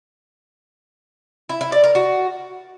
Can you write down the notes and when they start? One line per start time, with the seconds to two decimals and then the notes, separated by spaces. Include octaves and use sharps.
1.49 E4
1.61 E4
1.72 D5
1.84 A#4
1.95 F#4